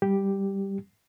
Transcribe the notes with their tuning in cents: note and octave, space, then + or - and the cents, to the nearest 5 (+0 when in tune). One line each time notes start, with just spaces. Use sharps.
G3 +0 G4 +0